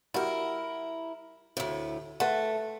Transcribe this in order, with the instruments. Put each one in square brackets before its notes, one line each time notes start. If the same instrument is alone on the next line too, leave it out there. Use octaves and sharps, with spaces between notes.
[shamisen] G3 F#4 [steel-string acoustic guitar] E4 A#4
[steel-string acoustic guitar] D2 A2
[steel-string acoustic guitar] A3 [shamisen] B4 F#5